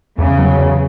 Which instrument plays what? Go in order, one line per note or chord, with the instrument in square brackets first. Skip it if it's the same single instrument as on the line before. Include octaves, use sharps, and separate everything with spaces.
[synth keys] E2 [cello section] C#3
[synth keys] F#3
E2